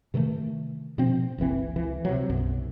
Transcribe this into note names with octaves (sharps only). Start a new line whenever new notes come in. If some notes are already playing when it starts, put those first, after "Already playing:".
C3 D#3 E3 A3
B2 F3 C4
F#1 C2 E3 C4
C#2 E3
C3 F#3
B1 F#2